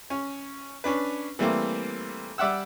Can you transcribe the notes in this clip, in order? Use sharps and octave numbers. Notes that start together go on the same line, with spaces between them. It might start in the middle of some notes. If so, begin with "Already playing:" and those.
C#4
C#4 D4 B4
E3 G3 A3 A#3 C4
G3 D5 E5 F#5 E6